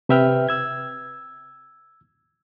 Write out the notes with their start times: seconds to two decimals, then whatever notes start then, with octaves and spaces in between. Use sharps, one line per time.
0.09 C3 B4 E5 G5 F6
0.49 E6 G#6